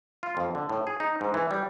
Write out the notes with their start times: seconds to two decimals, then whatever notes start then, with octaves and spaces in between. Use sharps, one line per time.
0.23 F4
0.37 F2
0.55 D3
0.69 A2
0.87 G#4
1.00 D#4
1.21 G#2
1.34 E3
1.51 G3